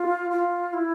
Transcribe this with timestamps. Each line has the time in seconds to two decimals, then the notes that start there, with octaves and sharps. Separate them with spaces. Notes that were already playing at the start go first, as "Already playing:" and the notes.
Already playing: F4
0.31 F4
0.73 E4